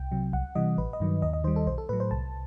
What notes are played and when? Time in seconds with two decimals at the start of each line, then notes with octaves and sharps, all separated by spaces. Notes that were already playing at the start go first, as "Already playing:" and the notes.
Already playing: C2 G5
0.12 C3 F#3
0.33 C2 F#5
0.55 C3 E3 G3 D#5
0.78 A1 B4
0.93 D#5
1.00 G2 D#3 F#3
1.22 D#2 D#5
1.33 D#5
1.44 D#3 C5
1.48 G3
1.56 A4
1.66 B1 C5
1.78 A4
1.89 A2 F#3 B4
2.00 C5
2.11 C2 A5